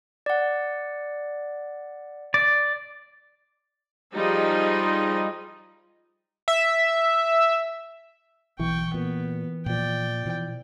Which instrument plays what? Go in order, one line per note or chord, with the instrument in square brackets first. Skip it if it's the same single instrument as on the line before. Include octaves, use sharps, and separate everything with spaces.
[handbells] D5 F#5
[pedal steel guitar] D5
[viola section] F3 G3 D#4 G#4 D#5
[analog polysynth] E5
[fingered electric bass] B1 [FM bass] E3 [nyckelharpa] G5 C#6
[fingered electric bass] A#2 [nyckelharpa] B3
[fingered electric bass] A#2 F3 [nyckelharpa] D5 G5
[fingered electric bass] B2 E3 F3